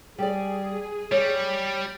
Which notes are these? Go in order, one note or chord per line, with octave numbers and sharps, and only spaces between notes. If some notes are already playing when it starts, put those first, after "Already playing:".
G3 G#4 D5
G3 C#5